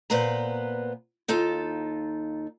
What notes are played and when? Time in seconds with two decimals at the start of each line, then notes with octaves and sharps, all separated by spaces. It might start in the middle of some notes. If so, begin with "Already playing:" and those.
0.10 A#2 B3 B4 C5 F5 A#5
1.28 D#2 D#4 F4 A4